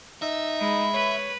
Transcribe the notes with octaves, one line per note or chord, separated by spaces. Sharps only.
D#4 E5
G#3 B5
B4 C#5